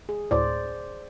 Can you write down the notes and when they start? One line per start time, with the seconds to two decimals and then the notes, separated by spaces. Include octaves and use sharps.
0.09 G#4
0.31 D2 A2 C5 D5